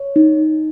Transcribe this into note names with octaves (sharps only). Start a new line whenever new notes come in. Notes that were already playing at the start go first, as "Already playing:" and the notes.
Already playing: C#5
D#4